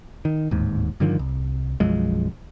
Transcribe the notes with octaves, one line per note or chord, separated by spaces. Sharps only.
D#3
D1 D#2 G#2
G2 D3 D#3 F3
C2
B1 F#2 F3 G#3